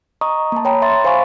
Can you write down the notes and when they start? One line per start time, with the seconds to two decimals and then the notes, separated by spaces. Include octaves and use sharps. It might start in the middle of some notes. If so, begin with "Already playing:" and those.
0.21 D#5 A#5 C#6 D#6
0.52 A#3 A5
0.65 C#5 G5 A#5 B5
0.82 E5 C6 A6
1.05 C5 F5 G#5 B5 C#6